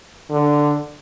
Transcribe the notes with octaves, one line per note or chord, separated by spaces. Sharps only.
D3